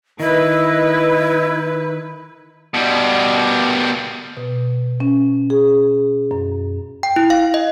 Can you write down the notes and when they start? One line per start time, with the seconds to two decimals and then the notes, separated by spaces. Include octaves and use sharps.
0.20 D#3 E4 B4 D#5
2.74 B2 G3
4.37 B2
5.00 C#4
5.50 G#4
6.31 F#2
7.03 G5
7.16 E4
7.30 F5
7.54 D#5